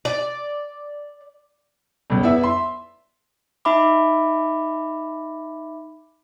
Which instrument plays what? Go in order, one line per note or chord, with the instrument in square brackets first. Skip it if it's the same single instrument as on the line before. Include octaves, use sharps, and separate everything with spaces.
[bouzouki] D5
[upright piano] G1 C#2
B3 E4 D5 E5
E5 C6
[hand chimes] D#4 E5 B5 D6